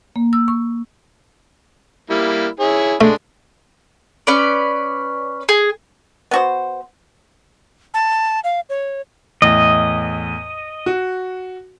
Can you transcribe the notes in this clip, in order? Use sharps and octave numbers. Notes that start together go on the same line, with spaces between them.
A#3
E6
C#6
G3 A#3 E4
E4 G#4 C#5
G#3 A3 D4
C#4 B4 D5
G#4
B3 F#4 C5
A5
F5
C#5
E2 A2 D#5
F#4